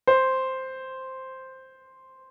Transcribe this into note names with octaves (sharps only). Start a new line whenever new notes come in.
C5